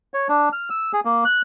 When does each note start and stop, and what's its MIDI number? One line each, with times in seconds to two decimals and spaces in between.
0.14 0.28 73
0.29 0.49 62
0.53 0.69 89
0.70 0.92 88
0.93 1.00 68
1.05 1.24 58
1.25 1.42 90